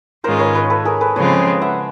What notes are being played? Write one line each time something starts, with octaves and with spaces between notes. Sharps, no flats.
G#2 D#3 G#3 C#4 F4 A#4 C5
B4 C#5
B4 C#5
A4 B4
G#4 A#4
A4 B4
C#3 F3 G#3 C4 F4 B4 C#5
E5 F#5